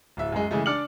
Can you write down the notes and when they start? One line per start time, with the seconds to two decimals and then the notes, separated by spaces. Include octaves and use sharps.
0.17 D1 E5
0.32 F#2 G#3
0.51 C#3 E3 G#3 A3
0.66 D4 D5 F6 C#7 F#7